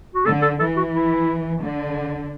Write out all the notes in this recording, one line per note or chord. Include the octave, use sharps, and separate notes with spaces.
F#4
D3 A4
A4
E3 A4
F#4
E4
D3